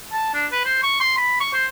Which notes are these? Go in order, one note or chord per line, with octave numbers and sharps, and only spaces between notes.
A5
D4
B4
C5
C#6
C6
B5
C#6
C5